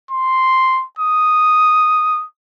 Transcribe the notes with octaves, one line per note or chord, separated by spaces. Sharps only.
C6
D#6